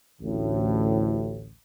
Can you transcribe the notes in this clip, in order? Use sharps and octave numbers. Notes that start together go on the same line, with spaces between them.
A1 D2 A2